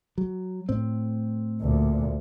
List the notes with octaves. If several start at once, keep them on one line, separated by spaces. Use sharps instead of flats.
F#3
A2 C4
D2 A#2